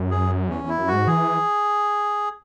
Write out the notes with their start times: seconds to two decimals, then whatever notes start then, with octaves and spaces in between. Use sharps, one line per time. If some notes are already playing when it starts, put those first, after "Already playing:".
Already playing: F#2
0.11 G#4
0.49 E2 C#4
0.64 E2 E4
0.78 F#2
0.88 F#4
0.93 G#2
1.07 E3 G#4